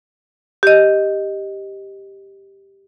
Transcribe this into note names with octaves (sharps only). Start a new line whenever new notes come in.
G4 D#5